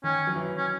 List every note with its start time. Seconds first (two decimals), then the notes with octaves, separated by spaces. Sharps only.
0.04 D#3 C#4
0.27 F#3
0.36 E3
0.58 C#4